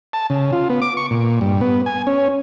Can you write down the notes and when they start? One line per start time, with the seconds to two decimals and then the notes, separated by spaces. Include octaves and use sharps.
0.13 A5
0.30 C#3
0.52 F4
0.70 B3
0.82 D6
0.97 C#6
1.11 A#2
1.41 G2
1.61 B3
1.86 G#5
2.07 C#4